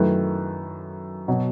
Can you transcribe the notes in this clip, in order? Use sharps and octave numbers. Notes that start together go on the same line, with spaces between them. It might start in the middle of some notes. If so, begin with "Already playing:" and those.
Already playing: F#2 D#3 A3 E4 B4
B2 F#3